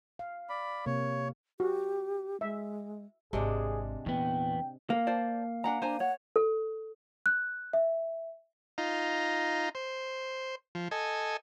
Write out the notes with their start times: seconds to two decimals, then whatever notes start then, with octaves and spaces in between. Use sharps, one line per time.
0.19 F5
0.49 D5 B5
0.86 C3 A#3 C#5
1.60 F#4 G4
2.41 G#3 E5
3.33 G#1 C3 G#3 D4 G#4
4.06 E2 A#2 B3 G5
4.90 A#3 F5
5.07 C5 D5 A5
5.64 D4 F#5 G#5 A#5
5.82 D4 C5 G#5 A#5
6.00 C#5 F#5
6.36 A4
7.26 F#6
7.73 E5
8.78 D#4 F4 A#5
9.75 C5
10.75 F3
10.91 A4 D#5 G#5